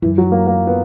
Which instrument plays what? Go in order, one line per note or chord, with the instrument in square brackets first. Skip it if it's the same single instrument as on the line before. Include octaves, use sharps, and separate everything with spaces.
[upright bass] F#2 [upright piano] E3
[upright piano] F#3
A#3
A#3
B3